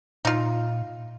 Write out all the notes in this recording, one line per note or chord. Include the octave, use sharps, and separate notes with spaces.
A#2 D#4 F4